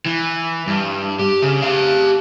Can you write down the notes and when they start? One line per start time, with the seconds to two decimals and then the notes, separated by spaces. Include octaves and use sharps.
0.06 E3
0.67 G2
1.19 G4
1.42 C#3
1.62 G4 F5